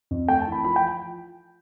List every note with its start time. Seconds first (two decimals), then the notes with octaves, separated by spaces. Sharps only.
0.11 F2
0.28 A3 G5
0.42 A5
0.47 E3 B5
0.64 F3 B5
0.76 G5